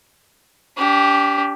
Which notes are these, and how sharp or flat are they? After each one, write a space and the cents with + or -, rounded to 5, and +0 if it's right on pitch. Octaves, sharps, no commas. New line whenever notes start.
D4 -40 G4 +0